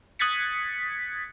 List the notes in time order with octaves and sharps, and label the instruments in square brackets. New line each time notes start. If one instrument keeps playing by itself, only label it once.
[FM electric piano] D#6 F#6 G#6 A6 B6 C#7